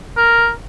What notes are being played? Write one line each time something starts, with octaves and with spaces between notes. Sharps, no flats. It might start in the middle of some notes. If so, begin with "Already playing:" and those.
A#4